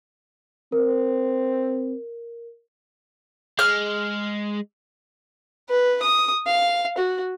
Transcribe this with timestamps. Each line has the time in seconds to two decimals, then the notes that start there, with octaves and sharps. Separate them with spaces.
0.72 C4 A#4
3.59 G#3 F6
5.70 B4
6.03 D#6
6.47 F5
6.98 F#4